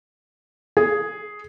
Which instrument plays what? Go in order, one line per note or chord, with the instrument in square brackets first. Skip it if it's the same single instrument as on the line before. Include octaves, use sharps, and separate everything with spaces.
[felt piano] G#4